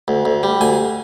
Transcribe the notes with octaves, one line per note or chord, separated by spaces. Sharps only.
D2
D2
G3
D2 G#5